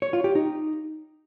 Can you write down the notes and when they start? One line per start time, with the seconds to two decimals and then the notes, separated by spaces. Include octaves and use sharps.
0.02 C#5
0.13 F4
0.24 G4
0.35 D#4